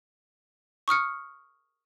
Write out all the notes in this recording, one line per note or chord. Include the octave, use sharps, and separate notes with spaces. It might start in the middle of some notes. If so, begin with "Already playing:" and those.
C#6 D#6 F6 C#7